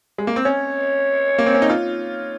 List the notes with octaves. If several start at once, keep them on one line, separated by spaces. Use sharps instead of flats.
G#3
A#3
C4
C#4 C#5
A#3
C4
C#4
D#4
F4 C#5